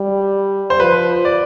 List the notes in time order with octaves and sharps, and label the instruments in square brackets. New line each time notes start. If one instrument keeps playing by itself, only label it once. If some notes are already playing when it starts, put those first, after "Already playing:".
Already playing: [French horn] G3
[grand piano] C5
[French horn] F3 [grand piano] B4
[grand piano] D5